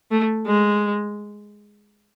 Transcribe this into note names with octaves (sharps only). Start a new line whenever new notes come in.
A3
G#3